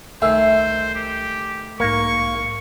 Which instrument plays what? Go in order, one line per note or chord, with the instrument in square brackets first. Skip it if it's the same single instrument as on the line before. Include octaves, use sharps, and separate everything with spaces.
[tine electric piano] C2 G#5 C7 [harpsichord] D#3 A3 [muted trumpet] C5 [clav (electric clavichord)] E5
[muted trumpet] G4
[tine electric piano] B1 G#2 [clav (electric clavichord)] A#3 [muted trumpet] C#6